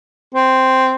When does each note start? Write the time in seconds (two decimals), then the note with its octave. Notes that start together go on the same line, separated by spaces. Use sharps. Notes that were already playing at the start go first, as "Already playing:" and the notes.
0.35 C4